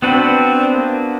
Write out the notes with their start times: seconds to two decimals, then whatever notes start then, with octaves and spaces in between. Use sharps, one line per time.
0.02 B3 C4 D4 F#4 B4
0.74 A#3